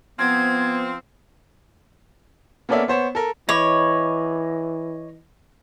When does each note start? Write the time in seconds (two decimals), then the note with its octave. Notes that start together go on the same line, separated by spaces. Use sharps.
0.19 F3 B3 C4 G#6
2.69 A#3 B3 C#4 A4 D5 E5
2.88 B3 C5 C#5
3.15 A4 A#4
3.49 E3 C#5 D#5 B5 D6